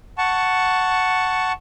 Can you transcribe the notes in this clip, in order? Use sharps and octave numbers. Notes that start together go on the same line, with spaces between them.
F#5 A5 C#6